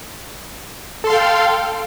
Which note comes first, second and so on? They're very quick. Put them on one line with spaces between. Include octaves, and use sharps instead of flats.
A4 C6 F5 G5